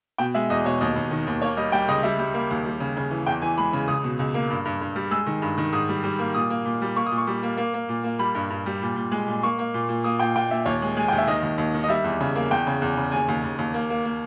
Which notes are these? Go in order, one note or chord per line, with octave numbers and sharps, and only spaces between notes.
B2 G5
G#3 E5
E2 D#5
B2 C#5
D#2 D#5
D#2
D#3
D#2
A#3 C#5
G3 D#5
G3 G5
C#2 D#5
G3 E5
G3
A#3
D#2
G3
C#3
C#3
E3
E2 G5
E3 G#5
G#3 B5
C#3
C#2 D#6
B2
C#2
A#3
G2
G2
G2
G3
G#3 E6
D#3
G2
D#3
G#2 D#6
G3
G3
A#3
A#2 D#6
A#3
A#2
G3
A#3 C#6
A#2 D#6
C#6
G3
A#3
A#3
A#3
A#2
A#3
G3 B5
G2
G2
G3
A#2
A#2
G#3
A#2
A#3 C#6
A#3
A#2
A#2
A#3 D#6
A#2 G5
A#2 G5
A#2 E5
D#2 C#5
G#3
G#3 G#5
D#2 G5
E5
D#3 D#5
D#2
D#2
D#3
D#5
G3 E5
E2
C#3
A#3
E2 G5
C#3
E2
C#3
D#2 G#5
D#2
D#2
D#2
A#3
A#3
A#3